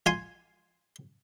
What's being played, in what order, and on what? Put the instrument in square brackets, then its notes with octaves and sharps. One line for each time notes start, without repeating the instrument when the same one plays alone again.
[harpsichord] F4 G#5 C6